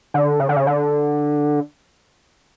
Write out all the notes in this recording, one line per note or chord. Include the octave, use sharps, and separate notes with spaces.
D3
C#3
D3
C#3
D3